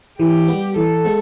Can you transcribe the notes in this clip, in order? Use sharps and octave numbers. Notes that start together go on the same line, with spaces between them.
E3 G4
G3 B3
E3 A4
G#3 B3